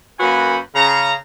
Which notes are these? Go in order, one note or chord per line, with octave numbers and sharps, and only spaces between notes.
F#2 A#3 F#4 B4 G#5 B5
C#3 A#5